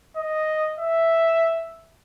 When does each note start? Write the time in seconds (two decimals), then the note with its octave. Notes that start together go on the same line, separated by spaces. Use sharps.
0.17 D#5
0.80 E5